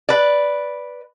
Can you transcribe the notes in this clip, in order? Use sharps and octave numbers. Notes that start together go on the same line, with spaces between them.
B4 D5